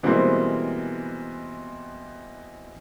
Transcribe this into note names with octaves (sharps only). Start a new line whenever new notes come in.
B2 E3 G3 G#3 A#3 C4